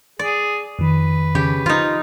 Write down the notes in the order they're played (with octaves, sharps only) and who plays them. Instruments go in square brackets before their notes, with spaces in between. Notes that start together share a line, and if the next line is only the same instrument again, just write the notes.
[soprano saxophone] G#4 [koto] D5
[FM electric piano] F2 D#3 [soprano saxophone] B4
[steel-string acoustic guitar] C#3 [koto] G4
[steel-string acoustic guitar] F3 [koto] D#4 F4